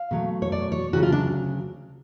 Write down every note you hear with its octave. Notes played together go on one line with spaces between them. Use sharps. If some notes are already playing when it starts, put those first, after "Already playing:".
Already playing: F5
B2 F#3 A3
C#5
D5
C#5
D2 C#3 F#3 F#4
F4
D4